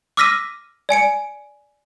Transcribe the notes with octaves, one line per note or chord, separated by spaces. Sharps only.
D6 E6 F6 A#6 B6 D#7
D5 G#5 C#7 D7